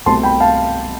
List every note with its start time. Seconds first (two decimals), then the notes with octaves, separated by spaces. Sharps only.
0.06 C2 B2 A3 C4 A5 C6
0.23 G5 B5
0.40 F5 A5